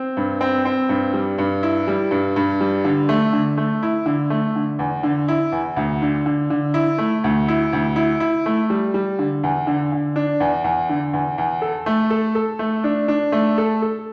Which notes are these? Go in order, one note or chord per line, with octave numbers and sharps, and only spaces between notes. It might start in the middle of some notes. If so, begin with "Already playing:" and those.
Already playing: C4
G2
C4
C4
G2
G3
G2
E4
G3
G2
G2
G3
D3
A3
D3
A3
E4
D3
A3
D3
E2
D3
E4
E2
D2
D3
D3
D3
E4
A3
D2
E4
D2
E4
E4
A3
G3
G3
D3
E2
D3
D3
D4
E2
E2
D3
E2
E2
A4
A3
A4
A4
A3
D4
D4
A3
A4
A4